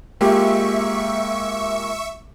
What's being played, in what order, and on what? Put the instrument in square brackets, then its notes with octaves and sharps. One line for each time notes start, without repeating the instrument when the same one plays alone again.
[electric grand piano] G#3 A#3 F4 [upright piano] G4 [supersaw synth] E5 C#6